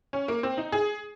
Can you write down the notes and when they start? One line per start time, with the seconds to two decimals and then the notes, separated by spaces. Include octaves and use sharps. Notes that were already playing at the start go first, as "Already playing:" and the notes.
0.13 C#4
0.28 A#3
0.43 C4
0.58 D#4
0.72 G#4